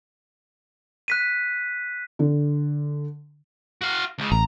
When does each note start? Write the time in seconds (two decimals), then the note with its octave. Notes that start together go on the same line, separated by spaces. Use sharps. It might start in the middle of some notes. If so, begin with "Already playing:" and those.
1.08 F#6 B6 D#7
2.19 D3
3.82 F#4 F5
4.19 C#2 C#3
4.32 A1 A#5